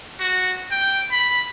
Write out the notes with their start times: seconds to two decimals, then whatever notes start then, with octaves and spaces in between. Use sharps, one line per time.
0.20 F#4
0.71 G5
1.12 B5